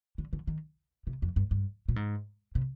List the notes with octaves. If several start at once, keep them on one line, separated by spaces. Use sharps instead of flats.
D3
D3
D#3
C3
F2
G2
G2
A#2
G#2
C3